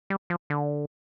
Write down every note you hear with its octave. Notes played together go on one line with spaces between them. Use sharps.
G3
F3
D3